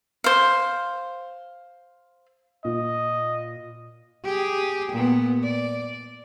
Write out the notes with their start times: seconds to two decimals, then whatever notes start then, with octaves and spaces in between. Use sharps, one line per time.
0.24 C5 F5
2.65 A#2 D#5
4.25 G4 G#4
4.92 A#2 B3
5.43 D5